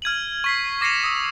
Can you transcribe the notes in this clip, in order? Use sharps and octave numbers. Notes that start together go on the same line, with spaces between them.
F6 G#6 D#7 F#7
C#6 B6 C7
D6 A#6 C7 C#7 E7 F7
D#6 E6